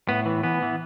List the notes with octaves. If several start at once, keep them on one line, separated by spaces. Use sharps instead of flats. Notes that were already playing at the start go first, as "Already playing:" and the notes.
A2 B3
E3
E3 B3
E3